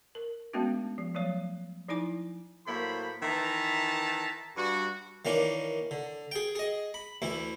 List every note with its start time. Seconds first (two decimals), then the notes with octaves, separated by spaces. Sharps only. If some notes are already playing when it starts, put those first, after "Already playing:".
0.15 A#4
0.53 G#3 A3 B3 C#4 D4 F#4
0.98 F3
1.15 F3 F#3 A3 C#5
1.89 F3 D#4 E4 G#5 D6
2.67 A2 F#3 A#3 E4 C5 B5
3.23 D#3 E3 B4 E5 A5 A#5
4.57 G2 F#4
5.25 D#3 E3 A#3 C#4 D4
5.91 D3
6.32 G#4 G5
6.55 G#4 D#5
6.94 B5
7.22 D2 E3 E4